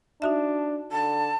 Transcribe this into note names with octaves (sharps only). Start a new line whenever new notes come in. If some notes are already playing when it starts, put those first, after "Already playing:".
D4 D#4 F#4 E5
D3 A5